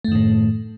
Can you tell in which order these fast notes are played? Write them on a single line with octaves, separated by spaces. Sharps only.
A3 F#2 D#3 A2